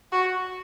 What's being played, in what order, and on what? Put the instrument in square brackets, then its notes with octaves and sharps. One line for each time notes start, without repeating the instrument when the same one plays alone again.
[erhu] F#4